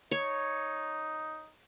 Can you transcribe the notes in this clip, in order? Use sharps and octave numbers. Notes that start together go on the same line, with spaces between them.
D#4 C#5